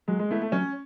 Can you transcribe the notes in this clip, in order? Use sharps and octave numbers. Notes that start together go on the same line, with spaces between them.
F#3 G#3
G#3
A3 B3 E4
A3
F#3 C#4